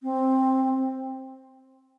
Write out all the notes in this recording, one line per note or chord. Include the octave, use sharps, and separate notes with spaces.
C4